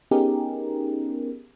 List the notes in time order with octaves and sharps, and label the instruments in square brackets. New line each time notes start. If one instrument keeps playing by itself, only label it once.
[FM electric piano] B3 C#4 D#4 G4 G#4 A#4